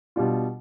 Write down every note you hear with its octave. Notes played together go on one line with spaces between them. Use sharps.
B2 G3 D4 F4